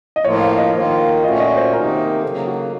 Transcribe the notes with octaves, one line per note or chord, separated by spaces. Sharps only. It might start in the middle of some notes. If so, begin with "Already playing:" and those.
D#5
A2 F3 A#3 F4 C#5
F5
D#5
D#3 A#3 F4
F5
A#2 A3 C#4 F#4 D#5
D#5
C5
C3 D#3 A#3 D#4 A#4
C#3 F#3 A#3 A4
F#4